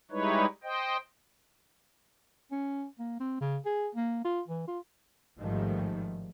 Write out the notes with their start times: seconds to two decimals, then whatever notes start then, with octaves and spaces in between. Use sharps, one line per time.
0.11 G3 G#3 D#4 E4 B4 C#5
0.63 C5 D#5 G5
2.51 C#4
2.99 A#3
3.20 C4
3.41 C#3
3.65 G#4
3.95 A#3
4.25 F4
4.48 E3
4.68 F4
5.38 A1 G#2 D#3 F3 G3 A3